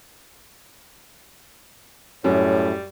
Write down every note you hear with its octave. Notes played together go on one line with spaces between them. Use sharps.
F#2 A2 G3 C#5